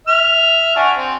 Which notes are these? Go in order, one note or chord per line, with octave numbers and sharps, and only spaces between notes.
E5 E6 F6
D4 F#4 G#5
C4